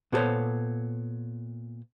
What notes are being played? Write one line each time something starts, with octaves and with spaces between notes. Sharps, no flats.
A#2 B3 G#4 A4 C5 C#5